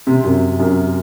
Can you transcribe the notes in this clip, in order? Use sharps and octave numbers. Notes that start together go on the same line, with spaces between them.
C3
F#2
F#2